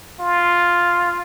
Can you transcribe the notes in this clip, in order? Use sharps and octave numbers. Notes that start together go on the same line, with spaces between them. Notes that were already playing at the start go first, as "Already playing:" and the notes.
F4